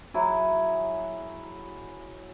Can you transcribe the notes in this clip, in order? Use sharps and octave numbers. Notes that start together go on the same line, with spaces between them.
F#3 E4 G#4